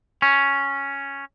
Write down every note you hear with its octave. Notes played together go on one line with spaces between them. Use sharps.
C#4